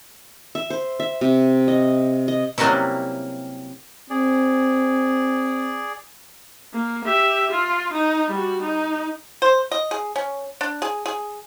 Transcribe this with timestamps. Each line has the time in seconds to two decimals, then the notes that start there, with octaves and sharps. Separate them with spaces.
0.55 E5
0.70 C5
1.00 E5
1.21 C3
1.68 D#5
2.28 D#5
2.58 C3 F#3 G3 A#3 C#4 E4
4.10 C4 G#4 D5
6.73 A#3
7.04 G4 E5
7.51 F4
7.93 D#4
8.30 G3 F#4
8.61 D#4
9.42 C5
9.71 D#5
9.91 G#4
10.16 C#4
10.61 D4
10.82 G#4
11.06 G#4